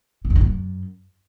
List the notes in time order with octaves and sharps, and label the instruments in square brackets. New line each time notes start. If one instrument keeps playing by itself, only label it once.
[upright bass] C3
E2
D3
G#2
F#2